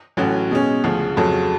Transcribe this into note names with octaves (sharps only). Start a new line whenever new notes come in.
A1 A2 F#3 C#4 F#4
B2 G#3 C#4
D2 C#3 F3
F2 C#3 F#3 A3